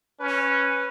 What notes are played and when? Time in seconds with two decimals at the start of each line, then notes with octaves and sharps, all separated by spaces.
0.20 C#4 B4